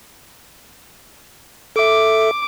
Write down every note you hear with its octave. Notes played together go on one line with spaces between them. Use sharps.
A4 E5 D6